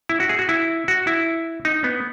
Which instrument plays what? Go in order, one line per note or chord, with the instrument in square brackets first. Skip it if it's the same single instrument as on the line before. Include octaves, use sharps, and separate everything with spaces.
[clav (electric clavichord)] E4
F#4
G#4
F#4
E4
F#4
E4
D#4
B3